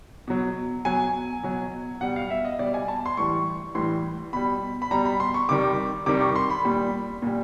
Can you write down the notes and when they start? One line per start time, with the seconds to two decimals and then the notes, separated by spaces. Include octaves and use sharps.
0.28 B2 F#3
0.85 B2 F#3 G#5
1.43 B2 F#3
2.01 B2 G3 F#5
2.16 F5
2.30 E5
2.45 D#5
2.59 B2 G3 D5
2.74 G#5
2.88 A5
3.06 C6
3.17 A2 E3 G3 C#6
3.75 A2 E3 G3 C6
4.33 B2 G3 B5
4.82 B5
4.91 B2 G3 A#5
5.05 B5
5.20 C6
5.34 C#6
5.49 C3 D#3 G3 D6
6.06 C3 D#3 G3 D6
6.21 C#6
6.36 C6
6.50 B5
6.65 A#2 G3
7.22 A#2 G3